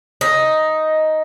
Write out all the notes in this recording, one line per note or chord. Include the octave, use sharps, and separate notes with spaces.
D#4